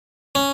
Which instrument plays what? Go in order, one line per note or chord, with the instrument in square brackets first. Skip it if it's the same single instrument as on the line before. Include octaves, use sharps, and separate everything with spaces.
[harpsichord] C#4